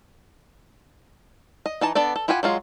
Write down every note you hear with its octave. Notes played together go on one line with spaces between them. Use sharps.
D#5
E3 D#4 A5
B3 D4 A4 D5
A4
E4 F4 G4 F#5 G#5
F#3 G#3 F4